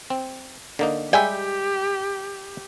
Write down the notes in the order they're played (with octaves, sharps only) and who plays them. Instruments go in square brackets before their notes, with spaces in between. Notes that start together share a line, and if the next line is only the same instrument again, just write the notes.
[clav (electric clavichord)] C4
D3 A#3 D#4
[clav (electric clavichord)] G3 G#3 E5 [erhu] G4 [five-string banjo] G5 G#5